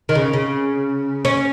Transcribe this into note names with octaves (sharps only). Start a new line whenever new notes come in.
D#3
C#3
C#3
C#4